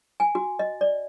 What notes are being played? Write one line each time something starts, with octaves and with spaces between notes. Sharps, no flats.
G#5
F#4
D#5
D5